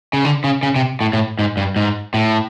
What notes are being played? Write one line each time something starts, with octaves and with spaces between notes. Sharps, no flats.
C#3
D3
C#3
C#3
C3
A2
A2
G#2
G2
G#2
A2